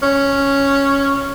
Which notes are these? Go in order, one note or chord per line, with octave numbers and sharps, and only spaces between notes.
C#4